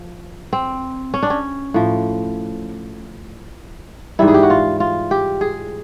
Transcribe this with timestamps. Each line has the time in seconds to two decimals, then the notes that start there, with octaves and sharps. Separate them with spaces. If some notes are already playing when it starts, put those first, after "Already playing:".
Already playing: F3
0.53 C4
1.14 C#4
1.23 D4
1.30 C#4
1.74 A2 F3
4.19 G#2 E3 G3 E4
4.28 G#4
4.34 G4
4.43 F#4
4.50 F4
4.80 F4
5.11 G4
5.41 G#4